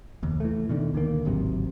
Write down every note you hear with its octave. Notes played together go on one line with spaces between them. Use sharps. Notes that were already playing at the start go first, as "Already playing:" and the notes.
F1 D#2
E3 A3
B2 D3 D#3
D2 D3 D#3 A#3
D1 G#1 C3 F#3